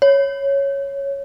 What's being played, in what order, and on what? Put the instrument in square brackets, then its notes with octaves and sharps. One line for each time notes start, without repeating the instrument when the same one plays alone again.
[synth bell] C#5